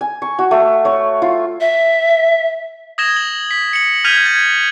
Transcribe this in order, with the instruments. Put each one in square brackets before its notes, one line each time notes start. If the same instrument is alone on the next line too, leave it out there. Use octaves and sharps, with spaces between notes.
[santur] G#5
C#6
F#4
A3
C#5
F4
[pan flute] E5
[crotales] D#6 G#6 A#6 E7 G7
F#7
B6
C#7 F#7
F6 G6 G#6 B6 D#7 F7
G#6 A6